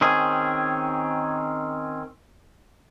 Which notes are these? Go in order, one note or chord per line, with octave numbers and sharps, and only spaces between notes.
D#3 C4 C#4 G#4